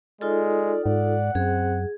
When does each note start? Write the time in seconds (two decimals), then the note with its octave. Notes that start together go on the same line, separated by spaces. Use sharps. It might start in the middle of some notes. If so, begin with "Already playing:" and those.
0.21 G#3 D#4 F4 A4 D5
0.86 G#2 D5 F#5
1.35 F#2 C4 G#4